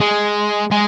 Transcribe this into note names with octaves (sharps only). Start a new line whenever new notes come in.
G#3
G#3